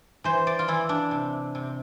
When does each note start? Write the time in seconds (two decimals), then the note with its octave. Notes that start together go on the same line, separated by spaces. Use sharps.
0.24 E3 C5
0.47 D5
0.59 F4
0.68 E3 E4
0.89 D4
1.11 C3
1.55 C3